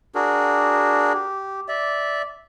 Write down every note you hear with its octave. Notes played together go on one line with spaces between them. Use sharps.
D4 F#4 G#4 A#4
G4
D5 E5